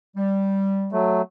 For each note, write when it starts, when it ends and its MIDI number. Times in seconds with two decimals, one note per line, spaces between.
0.16 0.95 55
0.92 1.22 54
0.92 1.22 57